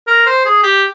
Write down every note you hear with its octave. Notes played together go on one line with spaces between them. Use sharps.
A#4
C5
G#4
G4